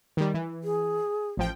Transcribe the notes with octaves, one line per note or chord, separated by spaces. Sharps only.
D#3 G3
E3
G#4
A1 F3 G5